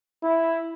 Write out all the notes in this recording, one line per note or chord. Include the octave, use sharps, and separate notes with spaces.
E4